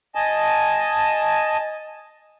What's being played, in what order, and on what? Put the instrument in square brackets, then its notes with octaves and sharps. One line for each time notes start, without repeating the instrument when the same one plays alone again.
[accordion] D#5 G#5 A5